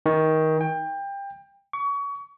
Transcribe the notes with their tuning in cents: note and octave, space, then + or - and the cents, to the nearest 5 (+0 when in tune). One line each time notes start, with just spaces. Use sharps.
D#3 +20
G5 +25
C#6 +30